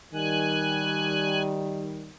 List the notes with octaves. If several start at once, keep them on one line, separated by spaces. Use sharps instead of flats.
D#3 G3 G#5 F#6